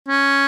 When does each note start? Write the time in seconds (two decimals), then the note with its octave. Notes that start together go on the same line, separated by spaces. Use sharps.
0.09 C#4